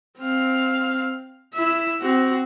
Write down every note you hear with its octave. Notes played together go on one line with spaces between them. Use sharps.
C4 F5
E4 E5
C4 F#4